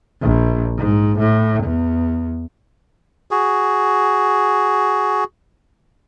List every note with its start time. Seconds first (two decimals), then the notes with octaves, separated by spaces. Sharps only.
0.22 A#1
0.77 G#2
1.19 A2
1.63 E2
3.31 F#4 G#4